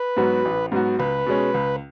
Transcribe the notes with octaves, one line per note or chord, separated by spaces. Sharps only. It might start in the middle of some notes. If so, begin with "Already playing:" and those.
Already playing: B4
G#2 F#3 B3 F#4
A1
G#2 F#3 B3 F#4
C#2 B4
B2 G#3 C#4
C#2